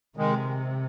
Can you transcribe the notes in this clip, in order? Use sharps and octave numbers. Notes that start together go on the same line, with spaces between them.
C3 D#3 G#3